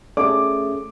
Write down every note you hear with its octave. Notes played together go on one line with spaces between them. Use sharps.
A3 C#4 G#4 D5 D6